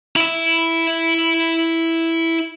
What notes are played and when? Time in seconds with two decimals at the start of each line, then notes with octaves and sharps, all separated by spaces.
0.16 E4 E5